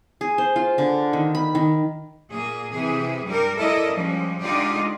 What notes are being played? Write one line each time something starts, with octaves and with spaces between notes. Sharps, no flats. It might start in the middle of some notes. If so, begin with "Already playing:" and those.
G#4
C5
F4
D3
D#3
B5
D#3
A#2 A#3 G#4
C3 E3 G#4
G2 G3 A#4
E4 A4 A#4 D5 D#5
F3 G3 G#3 C#4
D3 G#3 D#4 F4 G4 D5